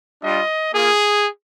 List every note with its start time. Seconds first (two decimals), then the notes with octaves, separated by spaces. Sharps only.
0.23 G3 D4 F4 D#5
0.73 A#3 F4 G#4